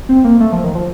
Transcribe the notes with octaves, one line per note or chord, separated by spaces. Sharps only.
C4
A#3
A3
F3
D#3
F3